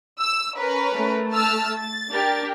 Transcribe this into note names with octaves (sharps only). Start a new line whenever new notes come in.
E6
C#4 A#4 B4
A3
A5 E6 F6
A6
D4 G4 A#4